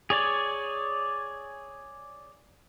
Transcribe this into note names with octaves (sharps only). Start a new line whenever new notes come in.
G#4 C#5 D5